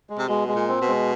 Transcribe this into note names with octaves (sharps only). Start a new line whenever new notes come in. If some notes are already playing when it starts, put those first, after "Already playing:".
G#3
C3
B2 G#3
G#3
A#2
C4
B2
G#3